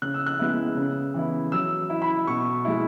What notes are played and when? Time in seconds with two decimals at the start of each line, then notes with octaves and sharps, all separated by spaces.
0.02 C#3 F#6
0.14 E6
0.26 F#6
0.39 G#3 B3 E4
0.77 C#3
1.14 E3 B3 E4
1.52 F#3 E6
1.90 E4
2.02 B5
2.27 B2 C#6
2.65 G#3 E4